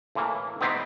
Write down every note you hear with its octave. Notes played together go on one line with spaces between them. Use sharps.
A2 E3 A#3
B3 C4 D#4 E4 G4 C5